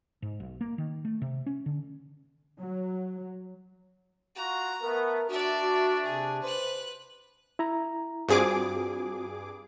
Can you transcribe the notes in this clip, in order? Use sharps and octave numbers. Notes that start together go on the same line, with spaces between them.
G#2
B1
A#3
D#3
A3
C3
C#4
D3
F#3
F4 F#4 A#5
A3 B3 A#4
A3 D4 F#4 D5 E5
F#4
C3 G#4
B4 C5 F#6
E4 A#5
G2 C4 F4 F#4 G#4 D6